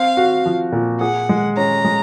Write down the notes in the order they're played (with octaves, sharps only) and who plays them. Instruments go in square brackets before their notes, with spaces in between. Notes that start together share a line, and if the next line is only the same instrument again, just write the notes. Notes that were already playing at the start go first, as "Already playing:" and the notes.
Already playing: [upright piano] C4 [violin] F5
[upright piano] F#4
F3
A#2
[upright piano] G#4 [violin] F#5
[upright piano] G#3
[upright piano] C#4 [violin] A#5
[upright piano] G#3